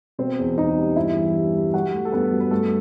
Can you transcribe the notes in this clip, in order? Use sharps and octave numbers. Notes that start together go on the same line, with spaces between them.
B2 C4 C5
E2
E2 D#4 D#5
G3
G2 E4 E5
E3
G3
G3
F#3 F#4 F#5
A3
A4
G2 B3 B4
F#3
B4
G2 A3 A4